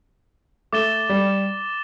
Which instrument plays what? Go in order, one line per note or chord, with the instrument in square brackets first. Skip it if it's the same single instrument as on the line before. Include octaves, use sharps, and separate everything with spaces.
[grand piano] A3 [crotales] D6 A6 E7 G7
[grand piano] G3